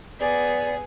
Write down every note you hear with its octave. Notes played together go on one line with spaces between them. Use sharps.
B3 G#4 D5